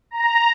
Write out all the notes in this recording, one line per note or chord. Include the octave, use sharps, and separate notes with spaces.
A#5